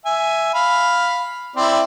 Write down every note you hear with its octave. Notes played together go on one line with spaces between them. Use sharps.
E5 G#5
F5 B5
C4 E4 D5